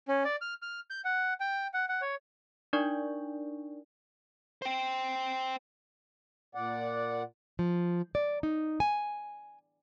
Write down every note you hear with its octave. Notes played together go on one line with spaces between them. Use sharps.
C#4
D5
F6
F6
G6
F#5
G5
F#5
F#5
C#5
D4 D#4 A#4 D5 C#6
C5 G5
A#2 D5 F#5
F3
D5
D#4
G#5